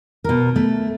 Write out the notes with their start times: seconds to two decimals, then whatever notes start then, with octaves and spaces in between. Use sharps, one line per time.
0.24 B2 A#4
0.56 A3